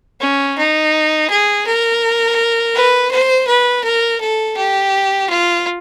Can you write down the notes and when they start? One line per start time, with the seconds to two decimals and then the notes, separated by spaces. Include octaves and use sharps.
0.21 C#4
0.57 D#4
1.30 G#4
1.67 A#4
2.75 B4
3.11 C5
3.47 B4
3.84 A#4
4.20 A4
4.57 G4
5.29 F4